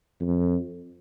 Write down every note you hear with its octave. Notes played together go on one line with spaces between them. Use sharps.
F2